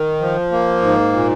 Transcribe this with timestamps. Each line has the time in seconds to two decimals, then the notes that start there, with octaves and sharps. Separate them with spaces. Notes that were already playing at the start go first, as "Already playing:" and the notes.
Already playing: D#3
0.21 F3
0.52 A#3
0.82 G#2
1.13 A#2